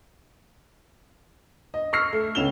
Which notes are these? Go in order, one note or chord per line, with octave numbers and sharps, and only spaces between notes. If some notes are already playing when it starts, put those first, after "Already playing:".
D#5
C#6 E6 F6 A#6 C7
A3
C#2 C#4 E7 F7 G7